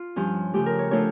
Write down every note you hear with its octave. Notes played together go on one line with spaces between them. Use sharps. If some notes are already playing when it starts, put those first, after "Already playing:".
Already playing: F4
G2 F3 C#4
C#3 F3 A3 G4
A#4
C#5
F3 A3 D4 F4 C#5